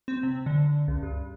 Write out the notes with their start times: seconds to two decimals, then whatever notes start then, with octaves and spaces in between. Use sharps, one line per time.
0.08 C4
0.23 C3
0.46 D3
0.88 C#2
1.03 G2